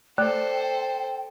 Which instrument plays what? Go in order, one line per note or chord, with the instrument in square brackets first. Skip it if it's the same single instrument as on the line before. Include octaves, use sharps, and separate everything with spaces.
[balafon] A3 [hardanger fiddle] A4 C5 [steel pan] D5 [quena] G5